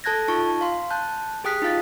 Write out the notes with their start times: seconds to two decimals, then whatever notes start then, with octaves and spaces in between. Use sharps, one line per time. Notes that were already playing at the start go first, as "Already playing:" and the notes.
0.04 A4 A5 F#6 G#6 A#6
0.28 D#4 F4 A5 C#6
0.61 F5 C6
0.91 A5 F#6 G6
1.44 G4 G#4 G5 D#6 F#6 B6
1.62 D#4 F4 F5 A6